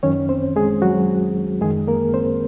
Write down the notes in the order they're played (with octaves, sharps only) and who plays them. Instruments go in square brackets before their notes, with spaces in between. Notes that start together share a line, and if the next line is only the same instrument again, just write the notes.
[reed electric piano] F#2 D#3 C#4 C#5
C4 C5
G#3 G#4
F#3 F#4
F#2 D#3 G#3 G#4
A#3 A#4
C4 C5